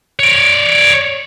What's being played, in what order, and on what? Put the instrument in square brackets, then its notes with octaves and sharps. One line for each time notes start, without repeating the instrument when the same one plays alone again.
[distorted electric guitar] C#5 D5